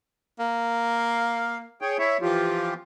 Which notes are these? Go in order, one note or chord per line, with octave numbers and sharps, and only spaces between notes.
A#3
F5
G#4 C#5 G5
E4 C#5 E5
E3 F3 F4 G4